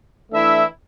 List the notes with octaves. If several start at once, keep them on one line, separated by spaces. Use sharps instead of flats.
E3 A3 D4 E4 E5